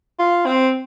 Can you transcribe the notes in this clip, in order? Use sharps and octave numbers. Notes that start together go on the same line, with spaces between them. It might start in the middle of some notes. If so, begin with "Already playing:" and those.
F4
C4